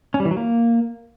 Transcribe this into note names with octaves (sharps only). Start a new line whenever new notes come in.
C#4
G3
E3
F#3
A#3